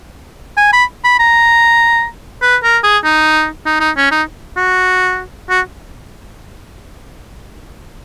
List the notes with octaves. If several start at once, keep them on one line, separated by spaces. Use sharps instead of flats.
G#5
B5
B5
A#5
B4
A#4
G#4
D#4
D#4
D#4
C#4
D#4
F#4
F#4